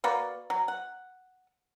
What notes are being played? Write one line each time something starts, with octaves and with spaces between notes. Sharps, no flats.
A#3 F#4 B4 D5
F#3
F#5